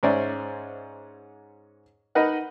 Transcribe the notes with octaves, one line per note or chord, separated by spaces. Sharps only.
G#2 C#4 C5 D5 E5
D#4 A#4 B4 D#5 F#5